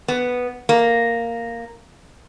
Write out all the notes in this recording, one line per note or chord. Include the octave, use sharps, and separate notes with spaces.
B3
A#3